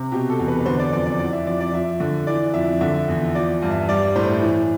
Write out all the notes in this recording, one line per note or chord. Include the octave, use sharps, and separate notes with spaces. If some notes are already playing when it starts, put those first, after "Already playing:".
Already playing: C3
B2 G4
A4
E2
B4
B4
D3 C5
D5
F2 D5
D5
E3 D5
E5
F2 D5
D5
F3 E5
D3
E3 D5
F2 E5
D3 E5
E2
F3 D5
G2
E5
G3 D5
A2 C5
E3